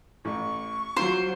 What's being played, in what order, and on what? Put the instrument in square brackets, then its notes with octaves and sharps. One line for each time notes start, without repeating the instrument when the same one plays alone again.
[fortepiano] A1 [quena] C#6
[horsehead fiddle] F#3 [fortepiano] F4 [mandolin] C5